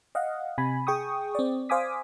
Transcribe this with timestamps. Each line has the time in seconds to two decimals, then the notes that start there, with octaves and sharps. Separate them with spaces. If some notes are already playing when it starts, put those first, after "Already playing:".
0.15 D#5 F5 F#5
0.58 C3 G#5 B5
0.87 G#4 G5 C#6 D#6
1.35 C4 D5
1.69 C5 F5 G#5 D6 D#6 B6